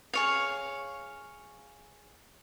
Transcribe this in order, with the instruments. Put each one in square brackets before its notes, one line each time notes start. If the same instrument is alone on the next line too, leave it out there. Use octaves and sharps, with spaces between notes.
[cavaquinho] G#4 C#5 F5